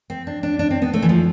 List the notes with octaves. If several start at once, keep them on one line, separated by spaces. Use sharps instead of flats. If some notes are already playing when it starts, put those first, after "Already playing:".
C4
D4
D4
D4
C4
B3
A3
E3
F3